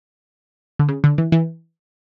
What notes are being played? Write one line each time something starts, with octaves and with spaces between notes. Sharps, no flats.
D3
C#3
D3
E3
E3